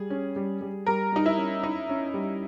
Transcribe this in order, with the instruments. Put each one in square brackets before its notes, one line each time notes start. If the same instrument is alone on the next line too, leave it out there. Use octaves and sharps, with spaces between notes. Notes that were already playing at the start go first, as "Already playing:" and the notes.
Already playing: [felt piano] G3 [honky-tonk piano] G#4
[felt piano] C#4
G3
G3
[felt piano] G3 [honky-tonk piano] A#4
[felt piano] G3 [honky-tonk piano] D#4
[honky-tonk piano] E4
[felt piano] C#4
[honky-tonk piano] D#4 [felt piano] E4
[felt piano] C#4
G3